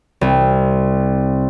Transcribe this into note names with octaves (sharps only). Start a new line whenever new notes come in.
C2